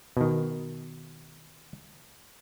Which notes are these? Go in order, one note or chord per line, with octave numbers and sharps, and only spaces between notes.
B2 D#3